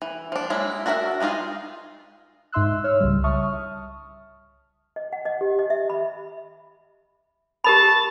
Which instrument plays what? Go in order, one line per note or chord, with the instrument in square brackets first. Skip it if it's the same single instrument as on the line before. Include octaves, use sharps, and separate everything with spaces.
[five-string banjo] E3
F3 D4
F#3 G#3 A#3 E4
D4 F#4 A#4 C5 E5
G#3 D4 D#4 F4 G#4
[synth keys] G#2 D#4 E5 C6 E6 F#6
C#5 E6 F6
C2 C#3 G3
E5 A5 C#6 D#6 F6
[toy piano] D#5
F#5
D#5
G4
D#5
E5
B5
[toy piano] G4 A#4 B5 [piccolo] A5